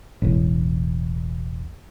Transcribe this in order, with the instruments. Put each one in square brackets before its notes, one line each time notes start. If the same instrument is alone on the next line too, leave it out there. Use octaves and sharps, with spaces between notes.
[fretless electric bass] E1 A1